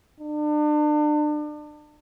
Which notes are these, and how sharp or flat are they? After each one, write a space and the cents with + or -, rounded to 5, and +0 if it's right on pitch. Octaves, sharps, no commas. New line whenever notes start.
D4 +35